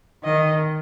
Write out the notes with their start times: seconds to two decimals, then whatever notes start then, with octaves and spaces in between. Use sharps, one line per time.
0.24 D#3 D#5